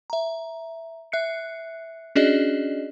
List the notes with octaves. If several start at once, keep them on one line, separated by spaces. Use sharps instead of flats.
E5 A#5
E5 F#6 C7 C#7
C#4 D4 F#4 G#4 D5 D#5